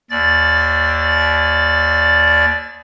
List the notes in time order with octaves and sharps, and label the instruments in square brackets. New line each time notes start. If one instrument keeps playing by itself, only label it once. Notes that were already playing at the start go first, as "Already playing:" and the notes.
[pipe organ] D#2 D5 A6